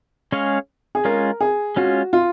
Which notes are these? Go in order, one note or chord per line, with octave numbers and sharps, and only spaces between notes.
G#3 C#4 G#4 C#5 F5
G#4
G#3 C#4 F4 A#4
G#4
G#3 C#4 F4 F#4
F4